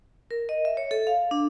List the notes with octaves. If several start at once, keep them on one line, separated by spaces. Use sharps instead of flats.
A#4
D#5
E5
C#5
A4
F5
D4